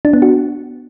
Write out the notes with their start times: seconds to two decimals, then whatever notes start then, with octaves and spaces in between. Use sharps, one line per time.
0.05 D4
0.13 B3
0.22 F#4